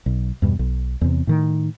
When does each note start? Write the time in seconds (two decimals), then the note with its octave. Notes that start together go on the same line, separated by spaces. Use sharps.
0.06 B1
0.42 E2 G2 B2
0.59 B1
1.01 E2 C3
1.27 A2 D#3